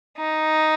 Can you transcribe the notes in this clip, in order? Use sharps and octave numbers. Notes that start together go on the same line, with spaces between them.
D#4